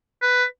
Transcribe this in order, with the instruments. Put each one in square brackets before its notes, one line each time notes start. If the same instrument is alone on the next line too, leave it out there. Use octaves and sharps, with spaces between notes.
[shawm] B4